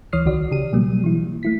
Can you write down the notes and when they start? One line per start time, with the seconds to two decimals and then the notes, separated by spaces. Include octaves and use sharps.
0.13 D2 E3 C#5 D#6 F6 C7
0.25 C2 D#3 F#4 D5
0.51 C#3 G4 D#7
0.73 B2 F#3 G3 A#3
1.04 E3 E4
1.43 A3 E4 B6